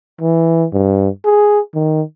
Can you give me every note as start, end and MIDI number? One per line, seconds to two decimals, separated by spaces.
0.21 0.66 52
0.73 1.09 43
1.25 1.60 68
1.75 2.02 51